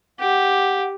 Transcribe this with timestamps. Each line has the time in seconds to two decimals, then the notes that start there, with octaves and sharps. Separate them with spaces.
0.19 G4 F#5